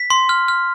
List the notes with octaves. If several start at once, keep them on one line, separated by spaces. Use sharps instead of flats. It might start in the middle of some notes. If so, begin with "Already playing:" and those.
Already playing: B6
C6
F6
F6